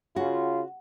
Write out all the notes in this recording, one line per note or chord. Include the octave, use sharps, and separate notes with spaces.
C#3 F4 F#4